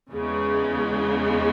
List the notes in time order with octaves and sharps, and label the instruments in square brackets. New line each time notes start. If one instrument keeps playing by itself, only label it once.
[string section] E2 C#3 G#3